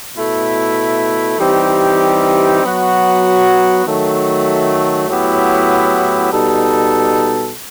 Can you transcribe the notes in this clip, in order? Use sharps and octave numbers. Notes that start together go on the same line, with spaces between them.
B2 A3 E4
E3 G3 C4 D#4 G4
F#3 B3 F#4
D#3 F#3 A3
A2 F#3 B3 E4 G4
B2 G3 D#4 A4